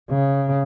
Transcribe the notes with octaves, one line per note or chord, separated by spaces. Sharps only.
C#3